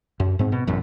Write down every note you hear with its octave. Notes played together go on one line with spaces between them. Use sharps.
F#2
G#2 C4
B2
E1 A1 F#2